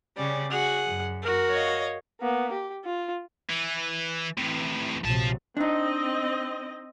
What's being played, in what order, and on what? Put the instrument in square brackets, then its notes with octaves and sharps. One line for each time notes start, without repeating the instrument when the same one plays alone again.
[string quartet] C#3 G3 C#4 [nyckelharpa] D5
[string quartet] F#4 [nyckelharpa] G#4 F#5
[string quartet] F#2
[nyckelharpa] F#4 A#4
[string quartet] C#5 D#5 F5
[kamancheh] A#3 B3
G4
F4
[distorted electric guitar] E3
[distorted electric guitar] A2 C3 [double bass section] E3
[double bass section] A#1 C3 F#3 [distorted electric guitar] F3 A5
[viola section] C4 D#5 [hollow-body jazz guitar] D4 D#4